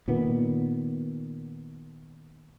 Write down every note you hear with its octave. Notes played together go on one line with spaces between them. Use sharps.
A#2 D#3 B3